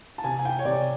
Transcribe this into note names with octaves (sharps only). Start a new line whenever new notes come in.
A5
C3 G#5
G#5
G5
C#5
C3 D5